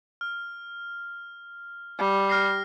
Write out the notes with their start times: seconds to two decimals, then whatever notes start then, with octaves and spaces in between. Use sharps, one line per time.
0.21 F6
1.99 G3
2.29 F6 A#6 C7